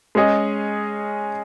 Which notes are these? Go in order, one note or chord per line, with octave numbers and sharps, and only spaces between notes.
G#3 C#4 G#4 D#5